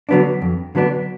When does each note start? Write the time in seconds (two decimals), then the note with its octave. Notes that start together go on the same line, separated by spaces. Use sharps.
0.09 D3 F#3 B3 D4
0.42 F2
0.75 D3 F#3 B3 D4